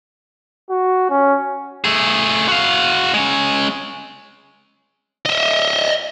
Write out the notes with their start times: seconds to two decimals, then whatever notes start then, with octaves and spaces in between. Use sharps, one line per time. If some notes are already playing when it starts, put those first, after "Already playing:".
0.70 F#4
1.10 C#4
1.84 A3 G#4
2.49 F#4 F5
3.14 G#3 C#4
5.25 D#5 E5